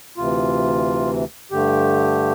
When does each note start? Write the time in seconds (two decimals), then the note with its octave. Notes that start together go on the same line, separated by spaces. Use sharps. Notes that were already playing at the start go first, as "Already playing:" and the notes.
0.17 D2 C3 E3 F4
1.51 G2 D3 A3 G4